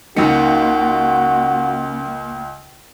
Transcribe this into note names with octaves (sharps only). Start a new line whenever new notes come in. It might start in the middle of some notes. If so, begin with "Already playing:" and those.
C#2 C#3 F#3 A#3 D#4 F#4 C#7